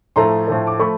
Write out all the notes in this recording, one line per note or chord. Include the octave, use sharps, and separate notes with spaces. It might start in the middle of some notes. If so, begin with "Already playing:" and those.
A2 F3 A3 A#5 C6
A2 F3 A3
D6
F3 A3 B5 C#6